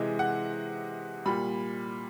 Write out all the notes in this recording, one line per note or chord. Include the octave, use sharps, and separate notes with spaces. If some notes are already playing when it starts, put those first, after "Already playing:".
Already playing: C3 E3 G#3 D#5
F#5
A#2 G3 B5